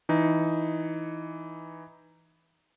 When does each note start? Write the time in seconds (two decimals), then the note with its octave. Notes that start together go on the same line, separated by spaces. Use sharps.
0.09 E3 D#4